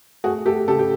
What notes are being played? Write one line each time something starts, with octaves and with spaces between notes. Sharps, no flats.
A3 F#4 G#4
A3 G4 A4
C#3 G4 A4
G4